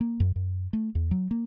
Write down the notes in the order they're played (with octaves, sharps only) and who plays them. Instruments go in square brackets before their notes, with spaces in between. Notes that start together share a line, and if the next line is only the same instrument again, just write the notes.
[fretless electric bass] A#3
F#2
F#2
A3
E2
F#3
A#3